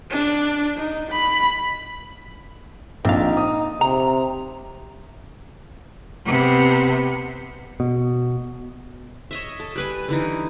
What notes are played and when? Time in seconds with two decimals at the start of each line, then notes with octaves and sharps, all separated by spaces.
0.10 D4
0.77 D#4
1.11 B5
3.05 A#1 C4 D#4 F5
3.37 D#6
3.81 C3 A#5
6.25 C3 B3
7.80 B2
9.31 C#5 D#5 E5
9.60 A4
9.76 G3 B4 G#5
10.08 D3 E3 D#4